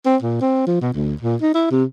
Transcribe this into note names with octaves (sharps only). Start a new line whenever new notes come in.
C4
A#2
C4
F3
B2
D2
A#2
D#4
E4
C3